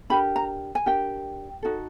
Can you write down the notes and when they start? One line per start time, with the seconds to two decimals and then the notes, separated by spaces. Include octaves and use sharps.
0.10 D4 G4 A#4 B5
0.36 A#5
0.75 G#5
0.86 D4 G4 A#4 G5
1.63 D#4 F#4 A4